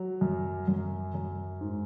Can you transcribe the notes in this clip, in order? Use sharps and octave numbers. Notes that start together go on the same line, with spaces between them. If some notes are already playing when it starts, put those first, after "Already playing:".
Already playing: F#3
F#2
F#2
F#2
G#2